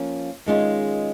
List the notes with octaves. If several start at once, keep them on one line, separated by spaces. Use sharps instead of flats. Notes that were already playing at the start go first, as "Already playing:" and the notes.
Already playing: F3 A#3 C#4
D#3 G#3 C#4 F4 G#4